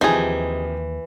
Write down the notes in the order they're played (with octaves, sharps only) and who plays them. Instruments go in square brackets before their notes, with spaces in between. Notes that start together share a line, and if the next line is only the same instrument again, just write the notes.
[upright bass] D#2 [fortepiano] C3 F3 [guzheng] E3 [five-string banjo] D#4 G#4